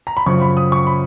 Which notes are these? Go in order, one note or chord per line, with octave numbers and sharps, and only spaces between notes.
A#5
B5
F#2 C#3 F3 C#6
B5
D#6
C#6
B5